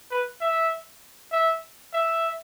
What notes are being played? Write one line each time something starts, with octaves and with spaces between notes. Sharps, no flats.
B4
E5
E5
E5